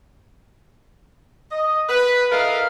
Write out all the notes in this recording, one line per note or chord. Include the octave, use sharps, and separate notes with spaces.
D#5
B4
E4 A4 A#4 D#5 F5